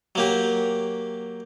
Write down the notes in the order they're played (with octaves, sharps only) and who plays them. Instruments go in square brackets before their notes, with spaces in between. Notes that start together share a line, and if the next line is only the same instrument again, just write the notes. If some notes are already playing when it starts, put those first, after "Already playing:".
[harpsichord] F#3 A#3 G4